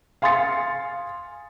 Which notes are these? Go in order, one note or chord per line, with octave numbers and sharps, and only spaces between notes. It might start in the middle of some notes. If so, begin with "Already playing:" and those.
F5 G#5 C6 D#6 A6 C#7